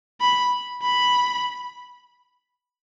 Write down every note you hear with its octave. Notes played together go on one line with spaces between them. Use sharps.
B5
B5